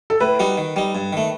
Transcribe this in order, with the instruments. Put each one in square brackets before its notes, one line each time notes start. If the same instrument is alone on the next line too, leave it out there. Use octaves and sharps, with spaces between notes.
[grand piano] A4
[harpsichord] A2 [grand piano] B4
[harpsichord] G3 D#4 F#4
D#3
G3 D#4
G2
D#3 A3